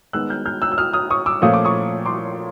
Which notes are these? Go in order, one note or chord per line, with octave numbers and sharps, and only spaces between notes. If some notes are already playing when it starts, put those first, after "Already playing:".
D#3 G#3 B3 E6 F#6
F6 G6
F6 G6
E6 F#6
E6
D#6 F6
D#6 F6
C#6 D#6
D6 E6
A#2 F3 A3 C#4 F4 D#6
D6
C#6 D#6
C6 D6